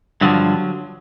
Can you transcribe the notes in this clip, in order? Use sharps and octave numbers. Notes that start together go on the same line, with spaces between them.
G2 D3 F3 F#3